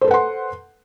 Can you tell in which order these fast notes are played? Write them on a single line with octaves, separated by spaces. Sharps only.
C5 A4 B4 F#5 C6